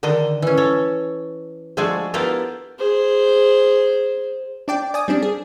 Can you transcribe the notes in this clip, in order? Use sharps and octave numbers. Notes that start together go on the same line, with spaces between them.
D3 D#3 D4 D#5
E3 C#4
A4 C#5
F3 G#3 A3 D4 F#4 G#4
B3 E4 F4 G4 A4 A#4
G#4 C5
D4 D5 G5
D5 G#5 D#6
G3 C4 D4
G#4